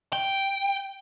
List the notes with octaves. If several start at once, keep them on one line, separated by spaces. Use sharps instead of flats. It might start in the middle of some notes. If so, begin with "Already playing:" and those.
G5